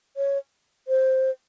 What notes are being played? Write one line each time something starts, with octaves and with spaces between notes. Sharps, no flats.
C#5
C5